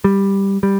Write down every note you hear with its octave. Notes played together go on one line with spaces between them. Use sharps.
G3
G3